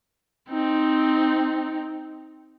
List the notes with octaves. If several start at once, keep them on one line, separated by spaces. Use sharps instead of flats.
C4 D#4